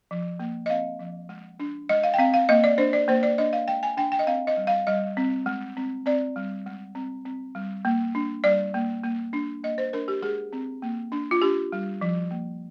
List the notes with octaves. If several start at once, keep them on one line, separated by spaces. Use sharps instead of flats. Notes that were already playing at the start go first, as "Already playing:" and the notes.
F3
A#3
D#5
C4 F5
F3
G#3
D4
G#3 D#5
F5
G5
C4 F5
F5
A#3 D#5
D5
D4 C5
D5
A#3 C5
D5
D4 D#5
F5
G#3 G5
G#5
D4 G5
G5
D#5
C4 F5
D#5
G3
F5
G3 D#5
C4
G#3
C4
C4 D5
G3
G#3
C4
C4
G3
A#3
D4
G3 D5
A#3
A#3
D4
A#3 D#5
C5
D4 A#4
G4
G#3 G#4
C4
A#3
D4
F4
D4 G4
G3
F3
A#3